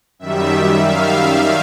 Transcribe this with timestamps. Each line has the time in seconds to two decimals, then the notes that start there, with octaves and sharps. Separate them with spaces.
0.19 F#2 D#3 G3 E5
0.82 F5